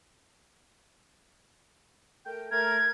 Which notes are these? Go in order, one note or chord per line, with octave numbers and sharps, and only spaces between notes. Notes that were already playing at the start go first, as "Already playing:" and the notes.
A3 A#4 G5
A3 A#4 G#6